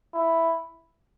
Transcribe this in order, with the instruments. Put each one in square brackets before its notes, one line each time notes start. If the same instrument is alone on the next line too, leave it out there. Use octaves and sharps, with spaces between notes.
[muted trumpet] E4